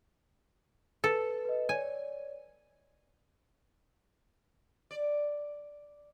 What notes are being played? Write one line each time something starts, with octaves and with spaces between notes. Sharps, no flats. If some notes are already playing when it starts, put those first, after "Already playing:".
A4 B4
B4 D#5
C#5 D5 G#5
D5